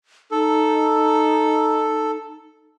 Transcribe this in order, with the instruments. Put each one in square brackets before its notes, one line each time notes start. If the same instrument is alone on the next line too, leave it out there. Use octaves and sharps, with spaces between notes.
[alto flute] D#4 [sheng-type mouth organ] A4